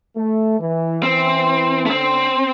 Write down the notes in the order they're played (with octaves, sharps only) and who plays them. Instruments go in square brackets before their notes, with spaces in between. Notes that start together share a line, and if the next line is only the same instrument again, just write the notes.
[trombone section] A3
E3
[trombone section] E3 [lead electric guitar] C4
[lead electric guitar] A3
[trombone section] D3 [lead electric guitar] C4